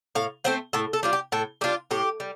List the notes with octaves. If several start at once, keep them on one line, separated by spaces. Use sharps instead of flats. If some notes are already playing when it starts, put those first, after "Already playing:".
A2 F5
A3 C4 F4 C5
A2 A4
A4
G3 D4 F4
G4
A2 A4
G3 D4 F4 G4
A2 G4
G3